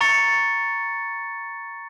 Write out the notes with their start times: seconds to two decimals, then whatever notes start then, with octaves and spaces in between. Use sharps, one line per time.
0.01 A#5 C#6 A6 C#7